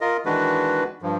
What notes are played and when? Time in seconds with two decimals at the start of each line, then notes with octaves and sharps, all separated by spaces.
0.01 F4 A#4 D#5
0.26 D#3 E3 G#3 D4 F#4 B4
1.02 G2 F3